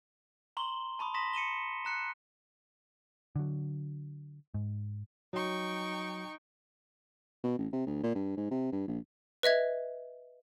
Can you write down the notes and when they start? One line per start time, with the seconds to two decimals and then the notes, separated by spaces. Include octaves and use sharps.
0.57 A#5 C6 C#6 G7
0.99 A5 B5 C#6 D#6
1.14 C6 C#6 D#6 A#6 B6 E7
1.33 C#7 D#7 E7 G7
1.85 A#5 F#6 C#7
3.36 D3 F#3
4.54 G#2
5.33 F#3 D#4 G5 C#6
7.44 B2
7.58 A1
7.73 C3
7.87 D2
8.03 A#2
8.15 G2
8.37 G#2
8.51 C3
8.72 G2
8.88 A#1
9.43 B4 D#5 E5 G#6